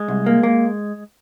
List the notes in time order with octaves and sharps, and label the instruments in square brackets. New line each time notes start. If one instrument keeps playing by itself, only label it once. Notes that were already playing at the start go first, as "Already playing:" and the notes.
Already playing: [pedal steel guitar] G#3
[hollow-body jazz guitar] C2
A#3
A#3